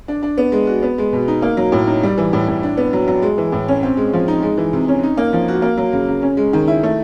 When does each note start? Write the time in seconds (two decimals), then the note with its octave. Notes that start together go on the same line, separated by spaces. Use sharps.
0.08 D4
0.23 D4
0.38 B3
0.52 G#3
0.67 F#4
0.83 B3
0.98 G#3
1.13 B2
1.28 D#4
1.42 A#3
1.57 F#3
1.72 A2
1.87 D#4
2.03 G3
2.18 E3
2.33 A2
2.48 A2
2.63 D4
2.77 B3
2.93 F#3
3.08 F#3
3.22 G#3
3.38 E3
3.52 A2
3.68 C#4
3.83 C4
3.97 G#3
4.13 F3
4.28 D#4
4.42 G#3
4.57 E3
4.73 C3
4.88 C#4
5.03 D#4
5.17 A#3
5.33 F3
5.48 F#4
5.62 A#3
5.77 F#3
5.93 C#3
6.08 C#3
6.22 C#4
6.37 G#3
6.53 D#3
6.68 E4
6.83 A3